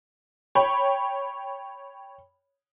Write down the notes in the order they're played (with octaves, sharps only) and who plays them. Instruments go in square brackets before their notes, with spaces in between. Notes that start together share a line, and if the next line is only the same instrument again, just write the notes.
[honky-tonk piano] C#5 G5 B5